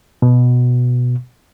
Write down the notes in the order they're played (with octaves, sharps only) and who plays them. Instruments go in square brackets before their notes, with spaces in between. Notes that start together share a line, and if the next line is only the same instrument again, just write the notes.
[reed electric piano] B2